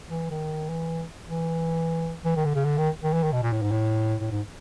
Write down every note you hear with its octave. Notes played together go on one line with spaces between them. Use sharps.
E3
D#3
E3
E3
E3
D#3
D3
C#3
D3
D#3
D#3
E3
D#3
B2
A#2
A2
G#2
A2
A2
G#2